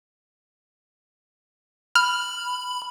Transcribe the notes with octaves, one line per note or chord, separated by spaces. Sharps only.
B5 F6